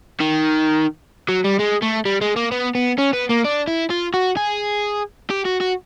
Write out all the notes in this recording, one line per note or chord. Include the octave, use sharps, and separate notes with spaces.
D#3
F#3
G3
G#3
A3
G3
G#3
A#3
B3
B3
C#4
B3
A#3
D4
E4
F4
F#4
G#4
G4
F#4
F#4